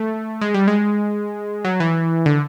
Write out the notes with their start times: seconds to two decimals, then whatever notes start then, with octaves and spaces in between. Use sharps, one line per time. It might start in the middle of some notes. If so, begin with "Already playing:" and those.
Already playing: A3
0.41 G#3
0.54 G3
0.68 G#3
1.65 F#3
1.80 E3
2.26 D3